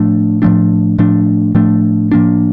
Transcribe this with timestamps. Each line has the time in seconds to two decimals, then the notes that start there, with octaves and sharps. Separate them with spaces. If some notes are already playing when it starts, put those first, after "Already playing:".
Already playing: A2 F3 A3 D4
0.42 A2 F3 A3 D4
0.98 A2 F3 A3 D4
1.55 A2 F3 A3 D4
2.12 A2 F3 A#3 D4